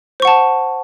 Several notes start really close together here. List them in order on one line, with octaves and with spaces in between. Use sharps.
C5 C#6 F#5 A5